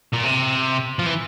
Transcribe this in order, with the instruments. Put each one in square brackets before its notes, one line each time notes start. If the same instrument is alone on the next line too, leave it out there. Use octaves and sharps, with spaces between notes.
[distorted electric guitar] A#2
C3
F3
E3